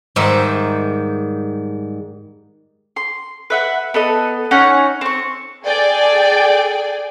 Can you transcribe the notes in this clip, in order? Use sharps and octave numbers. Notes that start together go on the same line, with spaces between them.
G#2 D#3 G3 E5
C6
B4 E5 F#5
B3 A4 D#5
C#4 D#4 F#5 G#5
C4 C#6
G#4 A4 D5 G5 G#5